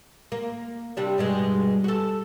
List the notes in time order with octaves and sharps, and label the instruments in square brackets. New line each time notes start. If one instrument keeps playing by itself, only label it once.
[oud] A#3
C3 G3 D4
G2 B2 G#3
F#4 A4